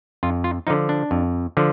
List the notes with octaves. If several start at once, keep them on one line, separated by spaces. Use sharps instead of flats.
F2 F4
F4
D3 F3 D#4
D4
F2
D3 F3